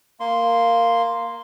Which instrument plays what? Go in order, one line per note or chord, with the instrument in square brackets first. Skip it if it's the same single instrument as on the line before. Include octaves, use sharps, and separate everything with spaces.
[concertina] A#3 C6